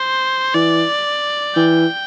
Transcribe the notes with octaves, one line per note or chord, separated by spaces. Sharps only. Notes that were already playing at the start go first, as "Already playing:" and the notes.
Already playing: C5
E3 D5
E3 G5